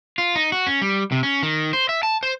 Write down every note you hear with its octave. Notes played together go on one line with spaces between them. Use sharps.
F4
D#4
F#4
C#4
G3
C3
C#4
D#3
C5
E5
A5
C5